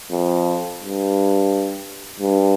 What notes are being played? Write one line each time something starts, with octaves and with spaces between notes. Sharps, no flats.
F2
G2
G2